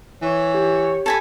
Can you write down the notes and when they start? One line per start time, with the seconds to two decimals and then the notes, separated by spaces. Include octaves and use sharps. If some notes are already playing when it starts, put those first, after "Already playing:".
0.22 E3 C#5
0.54 G4
1.06 A4 G#5 B5